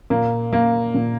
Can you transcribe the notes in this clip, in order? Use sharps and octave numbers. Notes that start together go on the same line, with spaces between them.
A#2 A#3
A#3
A#2